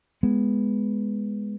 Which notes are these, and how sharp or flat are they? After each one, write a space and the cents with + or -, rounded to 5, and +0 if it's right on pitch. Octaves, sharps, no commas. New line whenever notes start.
G#3 +0 B3 +0